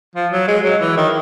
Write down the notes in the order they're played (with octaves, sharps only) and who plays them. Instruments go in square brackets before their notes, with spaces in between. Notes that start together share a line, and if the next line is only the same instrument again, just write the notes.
[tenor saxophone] F3
F#3
G#3
F#3
E3
D#3